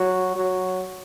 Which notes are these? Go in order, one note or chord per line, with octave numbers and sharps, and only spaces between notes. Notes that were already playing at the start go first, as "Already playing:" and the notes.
Already playing: F#3
F#3